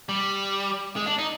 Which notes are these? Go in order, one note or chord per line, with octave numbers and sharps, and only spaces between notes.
G3
G#3
D4
D#4